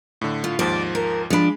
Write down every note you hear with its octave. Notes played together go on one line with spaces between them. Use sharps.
A2 D3
F4
D#2 G#2 F3 D5
A#4
F3 G#3 D4 B5